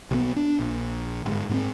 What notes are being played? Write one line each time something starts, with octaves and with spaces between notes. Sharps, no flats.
B1 F#3 B3
D4
A#1
G1 G#2
G#2 B3 C4